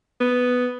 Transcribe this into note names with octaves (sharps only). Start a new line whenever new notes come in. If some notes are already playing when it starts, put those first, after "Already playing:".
B3